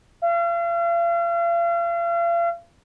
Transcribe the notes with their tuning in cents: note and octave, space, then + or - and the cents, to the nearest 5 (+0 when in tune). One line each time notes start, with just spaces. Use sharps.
F5 -40